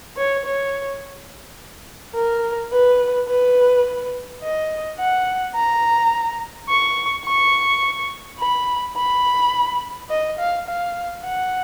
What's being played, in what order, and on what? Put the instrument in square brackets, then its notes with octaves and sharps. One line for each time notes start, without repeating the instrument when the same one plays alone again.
[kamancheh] C#5
C#5
A#4
B4
B4
D#5
F#5
A#5
C#6
C#6
B5
B5
D#5
F5
F5
F#5